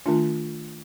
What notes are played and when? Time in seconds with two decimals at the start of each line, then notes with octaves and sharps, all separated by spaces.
0.06 D#3 A3 D4 F4